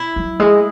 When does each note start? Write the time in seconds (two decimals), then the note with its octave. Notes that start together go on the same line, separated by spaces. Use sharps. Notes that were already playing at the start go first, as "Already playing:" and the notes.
Already playing: E4
0.16 F#3
0.40 G#3